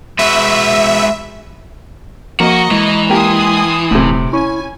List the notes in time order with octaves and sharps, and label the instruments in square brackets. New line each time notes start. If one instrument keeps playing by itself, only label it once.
[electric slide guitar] G#3 F#4 B4 [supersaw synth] E5
[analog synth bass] F3 [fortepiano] A#3 [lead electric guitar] F#4 [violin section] D#5 A#5 C#6
[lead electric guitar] E3 [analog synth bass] G#3
[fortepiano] A#3 G4 [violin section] G#5 C6 D#6
[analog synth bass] D#1 [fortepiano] A2 C3
[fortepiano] C#4 [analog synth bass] E4 [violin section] G#5